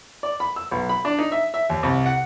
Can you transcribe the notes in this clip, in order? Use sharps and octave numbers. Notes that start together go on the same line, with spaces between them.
D5
B5
E6
B1
B5
D4
D#4
E5
E5
D#2
C2
F#5